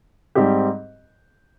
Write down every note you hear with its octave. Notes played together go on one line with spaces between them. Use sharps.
G#2 G3 C4 G4